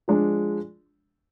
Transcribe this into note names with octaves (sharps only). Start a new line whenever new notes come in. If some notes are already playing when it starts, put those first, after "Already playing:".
F3 G#3 D4